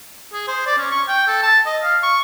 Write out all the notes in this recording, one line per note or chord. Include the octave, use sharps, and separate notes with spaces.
G#4
C5
D5
C#4
C#6
G5
A4
A5
D#5
F5
C#6